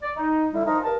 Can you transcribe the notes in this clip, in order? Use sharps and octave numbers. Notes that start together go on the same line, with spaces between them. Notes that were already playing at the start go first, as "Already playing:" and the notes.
D5
D#4
D3 G3 E4
F3 D#4 A#4
G2 A#4 A5